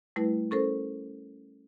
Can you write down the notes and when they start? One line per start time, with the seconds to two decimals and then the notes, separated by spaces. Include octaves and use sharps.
0.16 G3 A3 E4 B4
0.51 C#4 A4 A#4 C5